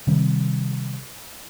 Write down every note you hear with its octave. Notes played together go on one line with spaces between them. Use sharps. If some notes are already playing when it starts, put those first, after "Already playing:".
C3 D#3 G3 C4